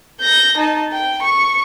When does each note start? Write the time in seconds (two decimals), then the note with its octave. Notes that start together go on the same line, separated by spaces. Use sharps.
0.21 G6 A#6
0.57 D#4 A5
0.92 G5
1.22 C#6